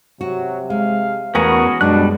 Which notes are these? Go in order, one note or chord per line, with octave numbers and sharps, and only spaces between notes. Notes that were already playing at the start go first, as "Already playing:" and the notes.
C3 F#3 F#4
G#3 F5
E2 A3 B3 C#4 F#4 G#4 A#4 F#5
F#2 B2 G3 G#3 D4 F#6